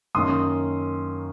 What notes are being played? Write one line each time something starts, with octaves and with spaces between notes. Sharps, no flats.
F#2 D#3 A#3 C#4 C6 D#6